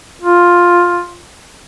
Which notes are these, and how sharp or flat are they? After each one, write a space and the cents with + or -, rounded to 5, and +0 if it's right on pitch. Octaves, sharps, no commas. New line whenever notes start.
F4 +10